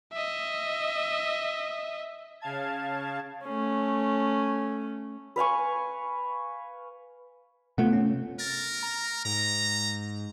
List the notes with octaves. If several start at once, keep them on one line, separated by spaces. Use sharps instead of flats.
D#5 E5
C#3 F5 A5 G#6
A3 C#4
B4 F5 G#5 C#6
C3 A3 B3 F4 F#5
C#4
A#4 A6
A#5
G#2 A#5